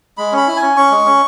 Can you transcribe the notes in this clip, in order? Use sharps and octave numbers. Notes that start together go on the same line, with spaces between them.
G#3 B5
C#4 B5
E4
G#5
C#4
C#4 C#6
G#3
C#4